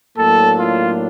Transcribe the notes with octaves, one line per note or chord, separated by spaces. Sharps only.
A2 F#3 A#3 D4 A4
F4